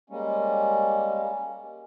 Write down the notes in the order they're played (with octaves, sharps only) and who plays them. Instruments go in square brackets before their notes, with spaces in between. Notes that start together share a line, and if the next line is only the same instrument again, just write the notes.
[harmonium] G3 G#3 A#3 C#4